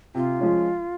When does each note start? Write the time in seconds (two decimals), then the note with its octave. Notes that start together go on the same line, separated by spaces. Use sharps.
0.15 C3 F4
0.40 F3 G#3 C#4